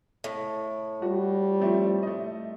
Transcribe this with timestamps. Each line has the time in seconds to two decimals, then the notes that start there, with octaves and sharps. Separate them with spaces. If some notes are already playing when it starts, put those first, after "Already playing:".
0.24 A2
1.02 G3 F#4
1.60 F3 A3 C4
2.03 A3 D#5